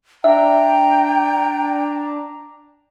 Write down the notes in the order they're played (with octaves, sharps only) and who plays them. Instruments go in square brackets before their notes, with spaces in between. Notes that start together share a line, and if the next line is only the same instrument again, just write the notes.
[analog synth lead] D4 [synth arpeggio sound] E5 [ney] G5 [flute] A#5